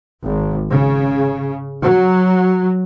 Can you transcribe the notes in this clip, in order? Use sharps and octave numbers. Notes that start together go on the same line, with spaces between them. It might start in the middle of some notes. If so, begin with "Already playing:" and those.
G#1
C#3
F#3